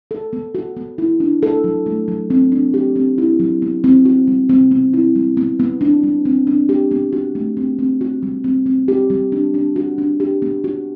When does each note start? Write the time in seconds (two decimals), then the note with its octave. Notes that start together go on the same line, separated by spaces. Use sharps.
0.11 A4
0.33 B3
0.55 F#4
0.77 B3
0.98 E4
1.20 D4
1.43 A4
1.64 F#3
1.86 A3
2.08 F#3
2.30 C4
2.52 D4
2.74 G4
2.96 C4
3.18 E4
3.40 F#3
3.62 B3
3.84 C4
4.05 F#4
4.28 G3
4.49 C4
4.71 B3
4.93 E4
5.15 G3
5.37 B3
5.60 B3
5.81 D4
6.03 G3
6.25 C4
6.47 D4
6.69 G4
6.91 B3
7.13 F#4
7.35 A3
7.57 C4
7.79 C4
8.01 F#4
8.23 G3
8.44 C4
8.66 C4
8.88 G4
9.10 G3
9.32 D4
9.54 D4
9.76 F#4
9.98 D4
10.20 G4
10.42 B3
10.64 F#4